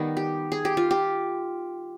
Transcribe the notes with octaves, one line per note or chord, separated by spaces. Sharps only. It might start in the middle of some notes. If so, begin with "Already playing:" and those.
Already playing: D#3 G3 B3 D#4
G4
G#4
G4
F4
G4